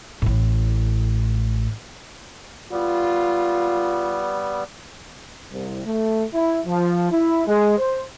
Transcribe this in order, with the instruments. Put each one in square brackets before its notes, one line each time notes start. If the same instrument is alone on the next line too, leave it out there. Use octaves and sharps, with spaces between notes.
[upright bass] A1 A2
[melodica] G3 B3 [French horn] F4
[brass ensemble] C2
A3
E4
F3
E4
G#3
C5